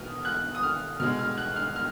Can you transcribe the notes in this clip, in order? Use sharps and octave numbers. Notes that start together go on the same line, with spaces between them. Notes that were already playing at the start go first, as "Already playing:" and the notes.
Already playing: B2 D#6 F6
F#6
D#6
F6
B2 G#3 F6
F6
F#6
F6
F6